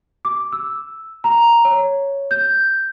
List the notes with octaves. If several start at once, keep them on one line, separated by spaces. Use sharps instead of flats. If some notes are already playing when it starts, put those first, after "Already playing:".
D6
E6
A#5
C#5
G6